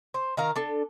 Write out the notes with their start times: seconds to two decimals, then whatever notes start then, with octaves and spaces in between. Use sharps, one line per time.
0.14 C5
0.37 D#3 A#4 F5 A#5
0.56 D4 A4